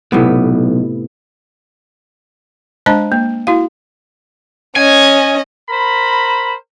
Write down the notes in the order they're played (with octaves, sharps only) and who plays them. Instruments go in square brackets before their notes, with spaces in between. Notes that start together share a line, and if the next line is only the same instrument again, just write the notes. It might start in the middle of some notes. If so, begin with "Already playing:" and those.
[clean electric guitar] B1 [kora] A2 C3 B3
[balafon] G#3 D4 C5 D#5 A5 A#5
A#3
E4 F#4 F5
[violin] C#4 D#5 [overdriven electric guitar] G#5
[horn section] A#4 C5 B5